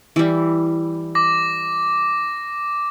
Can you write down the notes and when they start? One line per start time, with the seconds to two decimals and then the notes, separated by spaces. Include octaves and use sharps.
0.16 E3 G3
1.15 D6 A#6